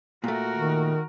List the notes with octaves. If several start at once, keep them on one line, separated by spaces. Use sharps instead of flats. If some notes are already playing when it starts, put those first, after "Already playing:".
A#2 A3 F#4 A#4
D#3